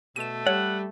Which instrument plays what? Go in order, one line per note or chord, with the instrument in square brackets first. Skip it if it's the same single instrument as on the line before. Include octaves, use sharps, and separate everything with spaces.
[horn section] B2 [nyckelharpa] A3 [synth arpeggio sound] D#7 E7
[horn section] G3 [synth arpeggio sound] C#5 [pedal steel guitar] F#5